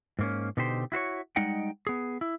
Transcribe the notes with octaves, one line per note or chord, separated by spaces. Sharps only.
G#2 A#3 C#4
B2 D3 D#4 G4 C5
E4 F#4 C5 C#5
G3 G#3 D#4 D#5 F#5 G5
B3 G#4
E4